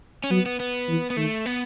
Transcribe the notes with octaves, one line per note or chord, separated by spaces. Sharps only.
C#4
F#3 B3
B3
B3
E3
B3
D#3 A3
B3